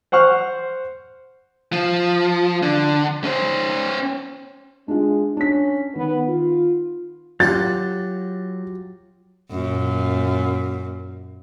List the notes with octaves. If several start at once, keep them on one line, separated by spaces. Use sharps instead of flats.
C5 F#5 C#6 F6
F3
D3
C#4 C5
G#3 D4 F4
C#4 D4 B6
D#3 B3
F4
F#3 F4 G4 F#5 A6
F#2 A#2